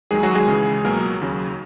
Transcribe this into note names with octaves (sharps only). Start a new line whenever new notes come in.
D#2 D#3 F#3 G#3 G#4
F#3 F#4
G#3 G#4
C#2 C#3 E3
C#2 B2 F#3 A#3 A#4
D#2 C#3 F#3